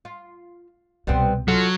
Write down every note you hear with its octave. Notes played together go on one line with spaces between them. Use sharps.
F4
C2 B2 G3 B3 C4
F#3 F4 F#4 A4